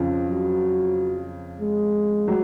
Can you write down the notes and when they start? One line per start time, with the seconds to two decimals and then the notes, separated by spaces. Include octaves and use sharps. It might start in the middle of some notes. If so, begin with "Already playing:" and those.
Already playing: F2 C#3 F3
0.27 F#3
1.61 G#3
2.28 F#3